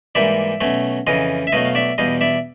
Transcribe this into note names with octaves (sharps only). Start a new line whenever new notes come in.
G#2 E3 G3 A#3 D5 E5
B2 F#3 A3 C#4
F2 C#3 E3 D#5 F5
E5
B2 F#3 A3 D#5 F5
F5
D5 E5
E2 B2 G3 D#5 F5
D5 E5